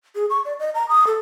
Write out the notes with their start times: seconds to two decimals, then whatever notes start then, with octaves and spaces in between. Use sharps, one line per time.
0.15 G#4
0.30 C#6
0.45 D5
0.59 D#5
0.75 A#5
0.89 D#6
1.07 A4